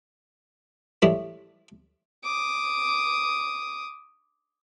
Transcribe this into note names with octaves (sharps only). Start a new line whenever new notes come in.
A1 A2 G3 E4
D6 D#6